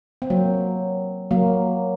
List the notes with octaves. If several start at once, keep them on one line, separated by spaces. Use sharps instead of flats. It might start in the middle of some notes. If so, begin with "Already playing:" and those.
C4
F#3 A#3
F#3 A#3